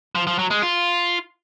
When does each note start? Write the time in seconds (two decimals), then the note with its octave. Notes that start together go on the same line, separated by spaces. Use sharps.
0.15 F3
0.27 F3
0.39 F#3
0.51 G#3
0.62 F4